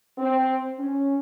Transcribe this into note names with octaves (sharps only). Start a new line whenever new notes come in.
C4
C#4